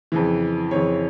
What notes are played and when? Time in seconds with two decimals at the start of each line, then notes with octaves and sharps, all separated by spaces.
0.12 F2 C#3 E3
0.71 F2 C#3 E3 C#5